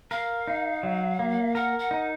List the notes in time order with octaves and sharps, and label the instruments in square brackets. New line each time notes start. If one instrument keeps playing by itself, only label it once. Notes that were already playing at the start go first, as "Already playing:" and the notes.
[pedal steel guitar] A#4 [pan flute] F5
[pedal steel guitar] D#4
F#3
A#3
[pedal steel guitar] A#4 [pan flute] F#5
[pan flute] F#5
[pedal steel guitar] D#4